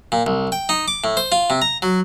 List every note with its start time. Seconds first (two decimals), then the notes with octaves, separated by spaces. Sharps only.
0.12 A#2
0.26 C2
0.52 G5
0.69 D#4
0.88 D6
1.04 A2
1.17 C5
1.32 F4
1.50 C3
1.62 A#5
1.82 F#3